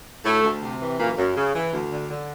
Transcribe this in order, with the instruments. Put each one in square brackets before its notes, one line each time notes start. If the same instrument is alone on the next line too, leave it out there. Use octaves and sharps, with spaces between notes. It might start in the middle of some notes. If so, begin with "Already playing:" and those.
[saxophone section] D2 A2 A3
D2
C3
E3
F#2 A#2 A#3
F#2
C#3
E3
D2
D3
D3